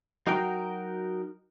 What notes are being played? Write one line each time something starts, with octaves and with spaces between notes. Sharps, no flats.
F#3 D#4 F#4 A#4 G5